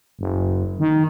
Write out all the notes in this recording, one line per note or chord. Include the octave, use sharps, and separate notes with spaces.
F#1
D#3